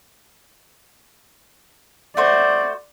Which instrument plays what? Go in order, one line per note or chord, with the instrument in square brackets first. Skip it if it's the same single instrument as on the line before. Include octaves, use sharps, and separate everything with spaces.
[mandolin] A3 F#4 C5 [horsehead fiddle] D5